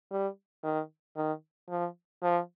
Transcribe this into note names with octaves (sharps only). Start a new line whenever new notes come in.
G3
D#3
D#3
F3
F3